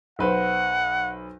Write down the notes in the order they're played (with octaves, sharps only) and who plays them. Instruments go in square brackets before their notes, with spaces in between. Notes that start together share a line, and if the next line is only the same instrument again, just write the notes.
[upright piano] B1 B4 C5 [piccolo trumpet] F#5